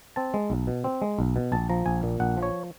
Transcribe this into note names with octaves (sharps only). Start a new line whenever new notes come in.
C4 A5
G#3
B1
B2
C4
G#3
B1
B2
A#1 A5
F3 A#5
A#1 G#5
A#2
A#1 F#5
F3
C#5